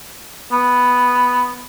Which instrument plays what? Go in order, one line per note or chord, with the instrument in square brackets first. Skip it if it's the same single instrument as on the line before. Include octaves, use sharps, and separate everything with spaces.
[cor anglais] B3